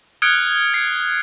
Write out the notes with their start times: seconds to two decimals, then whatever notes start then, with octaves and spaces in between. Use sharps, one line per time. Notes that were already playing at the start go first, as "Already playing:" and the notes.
0.22 D#6 F6 F#6 G#6 C#7 D7
0.74 G#6 C7